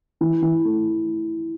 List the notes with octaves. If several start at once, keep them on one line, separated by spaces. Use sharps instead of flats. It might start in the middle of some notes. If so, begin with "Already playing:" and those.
E3
E3
A3